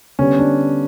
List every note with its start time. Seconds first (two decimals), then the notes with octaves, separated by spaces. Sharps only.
0.19 D3 G3 B3 C#4
0.39 D4